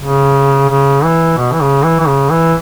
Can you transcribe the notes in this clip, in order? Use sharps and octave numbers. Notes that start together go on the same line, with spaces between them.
C#3
C#3
E3
B2
E3
C#3
E3
E3
C#3
E3